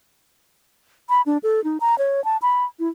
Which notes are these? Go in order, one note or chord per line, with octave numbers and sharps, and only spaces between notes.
B5
D4
A4
D#4
A#5
C#5
A5
B5
E4